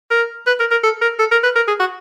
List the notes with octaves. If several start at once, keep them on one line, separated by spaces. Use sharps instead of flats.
A#4
B4
A#4
A#4
A4
A#4
A4
A#4
B4
A#4
G#4
F#4